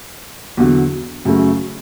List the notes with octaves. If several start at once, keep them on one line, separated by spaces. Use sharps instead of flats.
E2 D3 F#3
F#2 C#3 F#3 A3 C#4